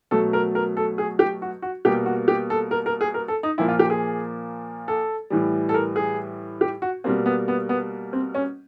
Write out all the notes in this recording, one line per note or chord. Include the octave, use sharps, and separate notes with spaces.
B2 F#3 A3 A4
A#4
A#4
A4
G#4
G4
F#4
F#4
B2 G3 A#3 G4
F#4
G4
A4
A#4
A#4
G#4
A#4
A4
D#4
A#2 F3 A#3 E4
F4
G4
G#4
A4
A2 E3 G3
A4
A#4
G#4
G4
F#4
B2 G3 A#3 C4
B3
B3
B3
C4
C#4